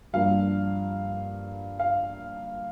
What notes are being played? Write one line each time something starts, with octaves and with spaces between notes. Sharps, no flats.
G2 F3 A#3 D4 F5
F5